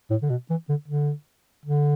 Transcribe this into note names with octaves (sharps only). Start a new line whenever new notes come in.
A2
D3
B2
E3
D3
D3
D3